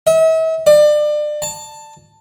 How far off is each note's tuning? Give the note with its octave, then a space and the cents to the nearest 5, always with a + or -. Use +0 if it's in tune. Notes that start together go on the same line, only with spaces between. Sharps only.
E5 -40
D5 +30
A5 +10